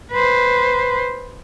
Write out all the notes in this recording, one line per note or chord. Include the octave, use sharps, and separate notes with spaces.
B4 C5